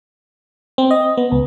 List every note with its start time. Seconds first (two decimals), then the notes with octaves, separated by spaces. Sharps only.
0.78 C4
0.91 D#5
1.17 B3
1.31 C#2